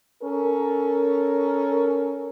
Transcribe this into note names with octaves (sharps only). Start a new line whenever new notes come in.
C#4 A4 A#4